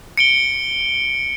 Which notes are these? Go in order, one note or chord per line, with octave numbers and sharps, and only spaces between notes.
C#7 D7 G7